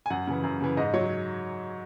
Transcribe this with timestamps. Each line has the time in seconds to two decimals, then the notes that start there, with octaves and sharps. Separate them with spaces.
0.06 G#5
0.10 F#2 F#5
0.27 C#3 E3
0.44 F#2
0.61 C#3 E3
0.77 G#2 D#5
0.94 F#3 C#5